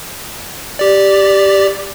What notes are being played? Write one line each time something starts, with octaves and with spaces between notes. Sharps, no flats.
G4 D5